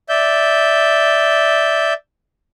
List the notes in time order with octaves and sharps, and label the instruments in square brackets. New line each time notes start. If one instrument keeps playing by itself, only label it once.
[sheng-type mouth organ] D5 E5 G6